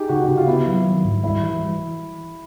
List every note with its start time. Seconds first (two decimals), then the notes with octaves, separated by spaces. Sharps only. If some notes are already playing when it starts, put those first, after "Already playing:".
Already playing: D#4 G4 G#4
0.09 C#3 F#4
0.18 G4
0.28 C#3 F#4
0.38 F4
0.47 B3 E4
0.66 F#3
0.85 D#3
1.05 G#2
1.24 G3 E4
1.43 E3